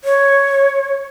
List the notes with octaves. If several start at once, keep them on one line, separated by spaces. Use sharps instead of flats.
C#5